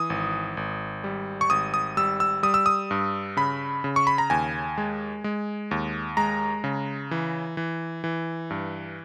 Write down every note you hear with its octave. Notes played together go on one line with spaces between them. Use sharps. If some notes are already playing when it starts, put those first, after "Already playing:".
Already playing: E3 D#6
G#1
G#1
G3
C#6
G#1 D#6
D#6
G3 E6
E6
G3 D#6
E6
D#6
G2
C#3 B5
C#3
C#6
B5
A#5
D#2 G#5
G#3
G#3
D#2
G#3 A#5
C#3
E3
E3
E3
G2